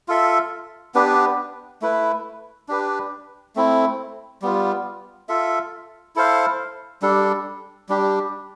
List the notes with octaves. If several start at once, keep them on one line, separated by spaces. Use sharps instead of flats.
F4 A4 E5
B3 D4 G4 B4
A3 E4 B4
D4 G4 B4
A3 C4 E4
G3 B3 F4
F4 A4 E5
E4 A4 C5 F5
G3 D4 A4
G3 D4 G4